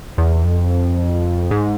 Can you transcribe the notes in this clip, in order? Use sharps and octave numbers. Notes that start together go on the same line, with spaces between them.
E2
F2
G#2